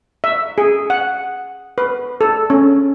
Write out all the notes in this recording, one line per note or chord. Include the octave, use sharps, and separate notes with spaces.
E5
G#4
F#5
B4
A4
C#4